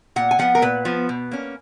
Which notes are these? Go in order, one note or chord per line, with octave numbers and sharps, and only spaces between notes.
A#2 F#5
G#5
F3 B3 F#5
A#4
A#2 B4
F3 B3
B2
A#3 C#4